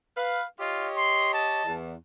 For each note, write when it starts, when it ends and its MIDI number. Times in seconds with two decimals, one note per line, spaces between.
0.17 0.44 71
0.17 0.44 77
0.60 0.89 65
0.60 1.61 67
0.60 1.61 73
0.60 1.61 75
0.96 1.29 84
1.33 1.75 81
1.65 1.94 40